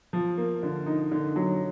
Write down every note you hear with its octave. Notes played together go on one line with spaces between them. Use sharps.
F3
A#3
D3
D#4
D3
F#3